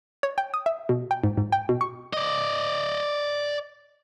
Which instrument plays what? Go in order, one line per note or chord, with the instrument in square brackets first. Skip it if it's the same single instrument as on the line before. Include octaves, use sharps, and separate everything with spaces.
[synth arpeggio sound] C#5
G5
D#6
E5
B2
G5
G#2
G#2
G5
B2
C#6
[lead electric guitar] D5 D#5